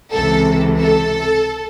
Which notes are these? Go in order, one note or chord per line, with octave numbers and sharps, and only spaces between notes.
C#2 C3 E3 A4
A4